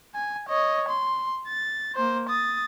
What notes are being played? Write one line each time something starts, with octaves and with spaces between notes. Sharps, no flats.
G#5
C#5 D#5
C6
A6
A#3 C5
D#6 A6